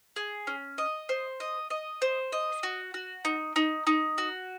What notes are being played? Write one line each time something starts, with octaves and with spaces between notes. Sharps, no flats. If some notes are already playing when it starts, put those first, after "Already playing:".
G#4
C#4
D#5
C5
D#5
D#5
C5
D#5
F#4
F#4
D#4
D#4
D#4
F#4